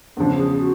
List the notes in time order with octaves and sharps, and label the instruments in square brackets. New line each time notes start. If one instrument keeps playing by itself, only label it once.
[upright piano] E2 C#3 F3 [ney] D4
[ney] G#4
F#4